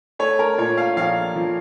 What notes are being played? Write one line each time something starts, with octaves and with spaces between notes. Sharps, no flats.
A3 C#5
A#4
A#2 C#5
F5
A#1 F5
F3